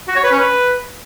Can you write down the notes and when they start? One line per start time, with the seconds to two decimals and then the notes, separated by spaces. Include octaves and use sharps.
0.07 F#4
0.15 C#5
0.23 B4
0.31 C#4
0.39 B4